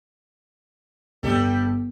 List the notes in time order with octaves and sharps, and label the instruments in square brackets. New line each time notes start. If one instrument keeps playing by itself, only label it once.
[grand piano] G1 [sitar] G3 G4 A4